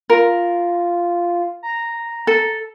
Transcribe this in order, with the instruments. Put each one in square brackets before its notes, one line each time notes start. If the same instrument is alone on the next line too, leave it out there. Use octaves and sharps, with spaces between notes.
[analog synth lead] F4 [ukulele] A#4
[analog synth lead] A#5
[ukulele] A4